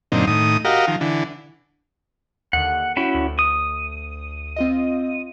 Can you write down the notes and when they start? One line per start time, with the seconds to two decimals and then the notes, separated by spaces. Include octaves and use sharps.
0.12 F#2 A#2 D3 C4 D#4
0.27 A2 D#3 D#6
0.65 F#4 G4 A#4 D#5 F5
0.87 D#3 F3
1.01 D3 E3
2.53 D#2 D3 F#5
2.97 C#4 E4 F#4 G5
3.14 D2
3.39 D#6
4.56 C4 F4 D#5